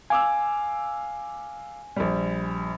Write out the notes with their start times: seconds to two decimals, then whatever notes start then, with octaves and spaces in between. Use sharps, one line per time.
0.10 F5 G#5 D6 E6
1.96 A#1 G3